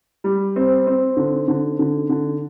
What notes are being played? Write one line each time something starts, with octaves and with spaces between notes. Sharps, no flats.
G3
C4
C4
D3
D3
D3
D3